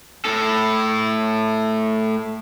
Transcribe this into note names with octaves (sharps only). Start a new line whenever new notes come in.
A2 A4